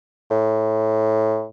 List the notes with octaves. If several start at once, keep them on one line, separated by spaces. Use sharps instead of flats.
A2